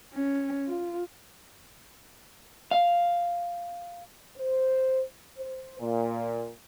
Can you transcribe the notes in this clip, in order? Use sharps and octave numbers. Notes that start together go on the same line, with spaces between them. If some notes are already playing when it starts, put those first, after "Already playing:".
C#4
F4
F5
C5
C5
A#2